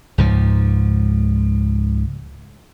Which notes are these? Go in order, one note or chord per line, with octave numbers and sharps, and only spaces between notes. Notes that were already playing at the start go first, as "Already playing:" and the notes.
C#2 G#2 F3